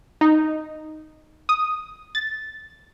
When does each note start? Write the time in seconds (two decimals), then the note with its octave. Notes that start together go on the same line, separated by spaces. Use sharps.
0.21 D#4
1.49 D#6
2.15 A6